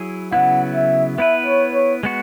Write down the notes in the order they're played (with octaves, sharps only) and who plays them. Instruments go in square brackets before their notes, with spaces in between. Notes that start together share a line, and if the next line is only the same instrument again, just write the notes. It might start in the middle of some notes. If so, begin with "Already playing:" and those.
Already playing: [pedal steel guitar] F#3 E4 G#4
[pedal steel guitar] C#3 F#3 B3 E4 [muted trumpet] F#5
[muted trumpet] E5
[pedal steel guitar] B3 E4 B4 [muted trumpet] E5
[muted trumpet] C#5
C#5
[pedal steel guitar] G#3 B3 F#4